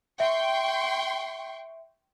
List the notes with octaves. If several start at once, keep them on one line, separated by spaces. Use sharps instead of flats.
E5 G5 C6 C#6